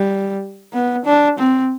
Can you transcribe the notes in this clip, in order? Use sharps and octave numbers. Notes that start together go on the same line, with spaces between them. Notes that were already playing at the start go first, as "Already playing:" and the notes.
Already playing: G3
B3
D4
C4